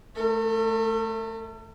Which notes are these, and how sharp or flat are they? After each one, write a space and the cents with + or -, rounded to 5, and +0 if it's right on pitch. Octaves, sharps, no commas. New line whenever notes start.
A3 -10 A4 +45